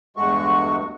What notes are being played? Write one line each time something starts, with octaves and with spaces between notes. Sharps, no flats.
E2 G2 G#3 A3 F#4 C#6